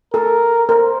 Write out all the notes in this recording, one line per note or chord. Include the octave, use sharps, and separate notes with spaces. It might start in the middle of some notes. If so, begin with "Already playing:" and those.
A4 A#4
A#4 C5